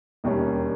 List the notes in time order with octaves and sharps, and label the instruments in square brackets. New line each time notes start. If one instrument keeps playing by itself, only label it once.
[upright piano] E1 D#2 D#3 G3 C#4